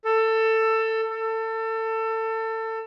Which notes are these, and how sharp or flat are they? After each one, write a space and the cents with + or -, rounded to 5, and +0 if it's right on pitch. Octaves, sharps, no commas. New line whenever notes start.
A4 +20
A4 +25